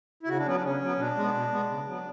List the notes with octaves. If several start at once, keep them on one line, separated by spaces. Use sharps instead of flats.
E4
C#3 F#4
D4
F#3 B3 C#4
D4
C#3 C#4
F#3 B3
B2 D4
G#3 B3
B2
G#3 B3
C#3
F#3 B3